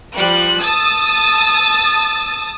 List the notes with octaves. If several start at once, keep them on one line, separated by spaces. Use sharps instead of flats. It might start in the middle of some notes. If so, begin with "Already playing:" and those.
F3 G3 F#6
A5 D#6 E6 A6